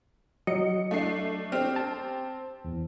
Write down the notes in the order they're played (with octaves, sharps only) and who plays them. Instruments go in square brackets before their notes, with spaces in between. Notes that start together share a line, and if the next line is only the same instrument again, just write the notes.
[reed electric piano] F#3 D#5 [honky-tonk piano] C#7
[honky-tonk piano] A3 D4 C7
[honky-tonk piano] C4 G4 [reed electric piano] F6
[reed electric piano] A5
E2